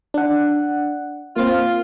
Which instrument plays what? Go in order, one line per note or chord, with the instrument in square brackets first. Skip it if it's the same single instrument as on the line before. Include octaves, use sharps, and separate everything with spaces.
[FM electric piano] D4 F#5
[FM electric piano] A#3 C4 [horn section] F4